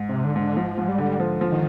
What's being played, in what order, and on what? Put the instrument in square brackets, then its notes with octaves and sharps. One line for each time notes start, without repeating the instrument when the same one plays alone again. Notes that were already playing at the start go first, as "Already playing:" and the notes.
Already playing: [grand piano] G#2
[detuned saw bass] C3
D3
[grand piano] G#2
[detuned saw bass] D3
[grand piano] G#2 [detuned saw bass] F3
[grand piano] G#2
[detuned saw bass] G3
[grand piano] D3
F3
F3
[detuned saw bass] D#3